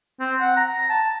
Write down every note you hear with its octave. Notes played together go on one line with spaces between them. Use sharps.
C4
F#5
A#5
A5